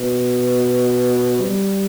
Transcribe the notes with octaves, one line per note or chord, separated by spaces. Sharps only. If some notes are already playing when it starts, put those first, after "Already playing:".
Already playing: B2
G3